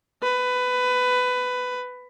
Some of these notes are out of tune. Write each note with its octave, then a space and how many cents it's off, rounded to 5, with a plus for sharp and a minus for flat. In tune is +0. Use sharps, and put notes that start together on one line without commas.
B4 +15